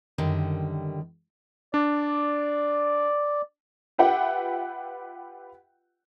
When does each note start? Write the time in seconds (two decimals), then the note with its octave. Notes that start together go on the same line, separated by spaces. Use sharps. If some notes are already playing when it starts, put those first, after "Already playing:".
0.18 F#2 D3 D#3 G3
1.74 D4 D5
3.98 F4 G4 B4 E5 F#5 G5